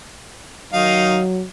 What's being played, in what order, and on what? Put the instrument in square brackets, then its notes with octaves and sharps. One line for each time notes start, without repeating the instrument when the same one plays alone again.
[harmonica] D#3 D#4 F5 [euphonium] F#3